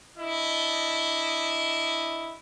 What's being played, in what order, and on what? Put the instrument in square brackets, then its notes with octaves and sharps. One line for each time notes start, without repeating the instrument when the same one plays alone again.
[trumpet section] D4 E4 D#5